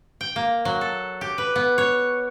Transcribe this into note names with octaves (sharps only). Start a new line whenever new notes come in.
G5
A#3
F#3
A4
G4
B4
B3
C#5